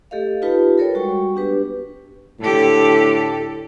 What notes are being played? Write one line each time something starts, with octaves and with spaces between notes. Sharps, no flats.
A3 G4 A4 D#5 F5
D#4 F4 G4 B4 A5 B5
A4 A#4 C#5 D5 G5
G3 G#3 F#4 F#5 G5 C#6
B3 D4 G4 B4
A2 D3 G4 A4